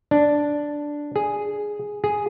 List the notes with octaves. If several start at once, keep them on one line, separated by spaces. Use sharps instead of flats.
D4
G#4
G#4